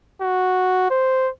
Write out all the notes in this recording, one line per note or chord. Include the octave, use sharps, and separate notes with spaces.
F#4
C5